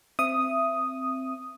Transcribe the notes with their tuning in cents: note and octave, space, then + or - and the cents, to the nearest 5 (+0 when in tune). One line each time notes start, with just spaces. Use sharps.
C4 +0 E5 +20 D#6 +0